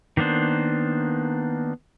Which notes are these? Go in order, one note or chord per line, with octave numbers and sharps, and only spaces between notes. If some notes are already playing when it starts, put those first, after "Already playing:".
D#3 A#3 B3 D4 C5